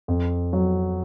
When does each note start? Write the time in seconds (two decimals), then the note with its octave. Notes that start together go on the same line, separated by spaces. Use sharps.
0.08 F2
0.53 F#3